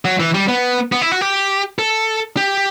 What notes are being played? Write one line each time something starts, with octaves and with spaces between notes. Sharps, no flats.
F#3
E3
G3
B3
B3
E4
F#4
G4
A4
G4